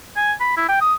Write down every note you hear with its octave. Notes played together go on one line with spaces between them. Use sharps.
G#5
B5
E4
G5
D#6